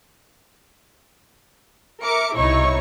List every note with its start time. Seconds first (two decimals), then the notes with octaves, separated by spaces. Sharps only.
2.02 A#4 E5 D6 C#7
2.35 C2 B2 D#4 E4 C#5 C#6